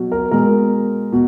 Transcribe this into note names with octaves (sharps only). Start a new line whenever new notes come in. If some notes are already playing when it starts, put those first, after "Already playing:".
Already playing: B2 F#3
A#4
B2 G#3 A#4
B2